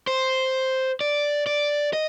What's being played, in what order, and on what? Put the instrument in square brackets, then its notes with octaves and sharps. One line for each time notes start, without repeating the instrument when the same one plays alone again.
[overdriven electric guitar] C5
D5
D5
D#5